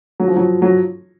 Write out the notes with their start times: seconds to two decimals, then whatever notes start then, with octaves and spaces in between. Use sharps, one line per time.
0.20 F#3
0.28 F3
0.36 F#3
0.62 F#3